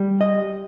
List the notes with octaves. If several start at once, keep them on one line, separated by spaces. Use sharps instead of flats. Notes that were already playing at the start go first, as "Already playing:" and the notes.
Already playing: G3
D#5